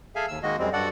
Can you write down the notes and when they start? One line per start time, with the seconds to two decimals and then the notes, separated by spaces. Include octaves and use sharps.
0.15 G#4 A4 E5 F5 G#5
0.28 D#2 E6
0.43 D#3 G#3 A#3 F#4 D#5
0.59 F#2 G3 G#3 C4
0.73 G2 F#4 A4 D5 F#5